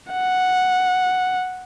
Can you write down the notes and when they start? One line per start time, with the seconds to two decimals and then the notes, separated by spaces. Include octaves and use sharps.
0.13 F#5